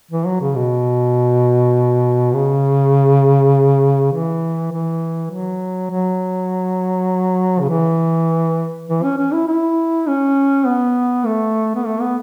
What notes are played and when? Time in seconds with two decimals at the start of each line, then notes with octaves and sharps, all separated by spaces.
0.11 E3
0.26 F#3
0.41 C#3
0.56 B2
2.34 C#3
4.13 E3
4.72 E3
5.31 F#3
5.91 F#3
7.60 C#3
7.69 E3
8.88 E3
9.03 C#4
9.18 C#4
9.33 E4
9.47 E4
10.07 C#4
10.67 B3
11.26 A3
11.75 B3
11.85 A3
12.00 B3